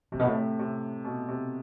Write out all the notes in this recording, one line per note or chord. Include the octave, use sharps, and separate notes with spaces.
A2 C3
B2
A2
C3
B2
C3